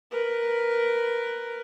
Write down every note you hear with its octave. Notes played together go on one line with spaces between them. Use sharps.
A#4 B4